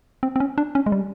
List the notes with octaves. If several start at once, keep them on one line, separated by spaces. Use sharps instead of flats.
C4
C4
C#4
D4
C#4
G#3
G3